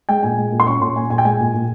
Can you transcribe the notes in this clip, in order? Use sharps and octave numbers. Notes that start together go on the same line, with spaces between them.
G#3 G5
A#2 G#5
G#3
A#2
C6
C#4 C#6
A#2 C6
A#2 G#5
A#2 G#5
G5
G#3 G#5
A#2
A#2